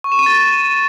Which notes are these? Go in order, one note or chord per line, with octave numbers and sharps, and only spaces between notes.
C#6
E7
D#7
A6